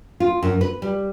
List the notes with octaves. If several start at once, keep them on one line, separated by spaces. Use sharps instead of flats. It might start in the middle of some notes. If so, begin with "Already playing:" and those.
F4
F#2
B4
G3